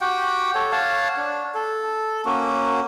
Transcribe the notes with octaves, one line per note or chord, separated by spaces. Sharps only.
F#4 G4 F#5 G5
A4 C#5
C#5 F5 F#5 A5
D4
A4
A#3 C#4 F#4